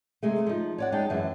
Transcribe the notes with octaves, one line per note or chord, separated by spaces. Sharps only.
C3 G#3 A3
F3 D#4
C#5 D5 F#5
G#3 D#4 G5 A5
F#2 E3